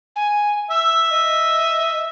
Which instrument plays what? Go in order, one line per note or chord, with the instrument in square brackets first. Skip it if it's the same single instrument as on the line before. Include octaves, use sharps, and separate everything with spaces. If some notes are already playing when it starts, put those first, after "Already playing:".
[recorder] G#5
[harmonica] E5 [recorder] E6
[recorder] D#5